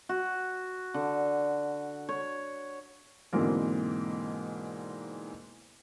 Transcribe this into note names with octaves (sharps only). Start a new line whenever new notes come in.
F#4
D3
C#5
G#2 B2 D3 E3 A#3 C4